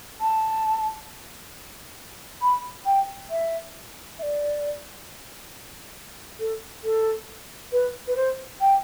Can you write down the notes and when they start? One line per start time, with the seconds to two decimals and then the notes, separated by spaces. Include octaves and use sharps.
0.20 A5
2.41 B5
2.85 G5
3.29 E5
4.18 E5
4.22 D5
6.39 A4
6.83 A4
7.72 B4
8.07 B4
8.16 C5
8.60 G5